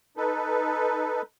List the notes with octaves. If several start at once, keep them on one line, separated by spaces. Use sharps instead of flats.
D#4 A4 B4